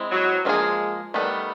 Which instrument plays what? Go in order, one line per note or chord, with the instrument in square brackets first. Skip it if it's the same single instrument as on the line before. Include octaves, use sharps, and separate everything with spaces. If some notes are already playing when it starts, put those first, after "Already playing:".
Already playing: [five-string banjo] G#3 C4 E4
[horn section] F#3
[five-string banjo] F3 A#3 C#4 F4 G#4 [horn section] G#3
[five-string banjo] D#3 G3 B3 [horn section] A3